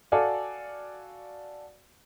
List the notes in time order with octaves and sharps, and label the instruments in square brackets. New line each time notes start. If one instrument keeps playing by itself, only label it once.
[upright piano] F#4 A4 D5 F5 G#5